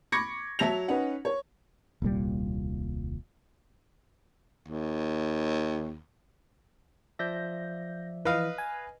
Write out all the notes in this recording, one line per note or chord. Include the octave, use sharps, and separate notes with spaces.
B5 C#6 D6 G#6 A#6 C#7
F#3 E5 A5 A#6 F7
C#4 D#4 B4 F#5
C#5
D#1 C2 A#2 G3
D#2
F3 D5 E5 G6 A#6
E3 B4 D#5 F5
G#5